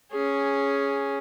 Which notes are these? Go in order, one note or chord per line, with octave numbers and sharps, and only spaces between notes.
C#4 G#4